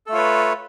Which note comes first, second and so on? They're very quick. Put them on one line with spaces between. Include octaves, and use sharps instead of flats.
A4 A3 F4 C#5 B4